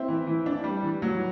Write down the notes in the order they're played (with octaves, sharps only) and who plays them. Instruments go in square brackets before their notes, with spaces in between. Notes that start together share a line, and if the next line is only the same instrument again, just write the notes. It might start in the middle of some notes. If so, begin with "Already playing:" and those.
Already playing: [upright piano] C4 E4
[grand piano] E3
E3
D4
G3
E3
F#3